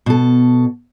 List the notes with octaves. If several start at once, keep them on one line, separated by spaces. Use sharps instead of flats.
B2 A4